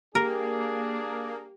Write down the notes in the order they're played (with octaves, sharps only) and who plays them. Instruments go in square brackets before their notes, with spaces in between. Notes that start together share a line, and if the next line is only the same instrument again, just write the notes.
[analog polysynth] A#3 [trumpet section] D4 G#4 [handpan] G4 [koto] A#4